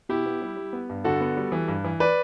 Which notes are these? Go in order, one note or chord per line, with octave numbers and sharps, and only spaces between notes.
B2 E4 G4
B3
G3
G3
B3
G2
D3 F#4 A4
B3
G3
E3
G2
E3
B4 D5